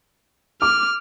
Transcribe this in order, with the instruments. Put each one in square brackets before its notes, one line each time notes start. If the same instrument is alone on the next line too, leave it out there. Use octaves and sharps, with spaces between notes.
[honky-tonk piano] D6 [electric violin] F6